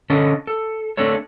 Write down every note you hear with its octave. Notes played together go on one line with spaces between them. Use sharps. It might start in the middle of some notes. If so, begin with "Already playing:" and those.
D3 C#4 A4 D#5
A4
A3 C4 D4 A4 C#5